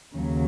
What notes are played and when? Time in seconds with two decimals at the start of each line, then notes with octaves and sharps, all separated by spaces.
0.15 D#2 C#3 F#3